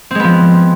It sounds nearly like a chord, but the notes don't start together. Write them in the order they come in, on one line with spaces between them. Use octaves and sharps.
C4 G#3 B3 F3